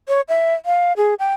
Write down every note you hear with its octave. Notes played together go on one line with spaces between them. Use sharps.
C#5
E5
F5
G#4
G5